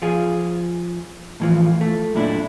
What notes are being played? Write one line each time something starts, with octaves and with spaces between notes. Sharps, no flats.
F3 F4 G#4
A2 E3 F3
A3
F#2 A#2 D4 E4